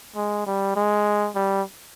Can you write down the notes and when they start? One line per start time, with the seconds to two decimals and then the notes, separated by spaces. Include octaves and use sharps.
0.16 G#3
0.46 G3
0.76 G#3
1.35 G3